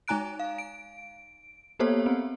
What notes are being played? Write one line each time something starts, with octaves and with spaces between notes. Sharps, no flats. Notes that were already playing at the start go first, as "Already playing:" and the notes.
G#3 D#4 G#5 A#5 F#6 D7
F5
D7
A#3 B3 G4 A4 C5 C#5
B3 C4